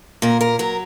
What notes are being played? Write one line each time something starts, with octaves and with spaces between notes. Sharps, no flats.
A#2 A#4
A#4
F#3 A#4